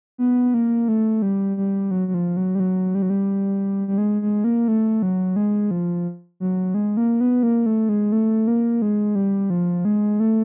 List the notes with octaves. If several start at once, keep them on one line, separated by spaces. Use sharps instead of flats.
B3
A#3
A3
G3
G3
F#3
F#3
F3
F#3
G3
F#3
G3
F#3
G3
G3
G#3
G#3
A#3
A3
F#3
G#3
F3
F#3
G#3
A#3
B3
A#3
A3
G#3
A3
A#3
G#3
G3
F3
G#3
A3